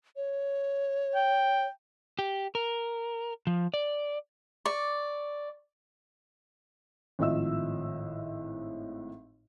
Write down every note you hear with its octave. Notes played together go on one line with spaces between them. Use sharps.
C#5
G5
G4
A#4
F3
D5
D5 C#6
G#1 A2 F3 D#5 E5 E6